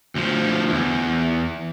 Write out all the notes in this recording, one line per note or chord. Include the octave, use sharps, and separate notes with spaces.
D2 F3
E2